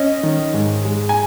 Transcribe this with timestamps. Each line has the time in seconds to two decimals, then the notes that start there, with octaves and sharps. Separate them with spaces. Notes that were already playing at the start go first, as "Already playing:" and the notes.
Already playing: C#4 D#5
0.23 D#3
0.54 G#2
0.85 G#3
1.09 G#5